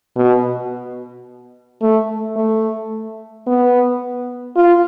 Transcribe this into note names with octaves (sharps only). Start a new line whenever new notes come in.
B2
A3
A3
B3
F4